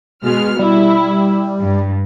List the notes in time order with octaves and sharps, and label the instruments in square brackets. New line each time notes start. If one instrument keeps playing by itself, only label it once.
[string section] B2 G#3 F6
[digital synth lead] G3 [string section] E4
[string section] G2